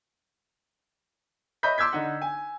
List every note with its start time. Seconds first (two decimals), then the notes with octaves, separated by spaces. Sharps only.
1.63 C#5 D#5 E5 B5 G6 B6
1.78 C6 D6 E6 G6 G#6 B6
1.93 D3 D#4 F#5
2.22 G#5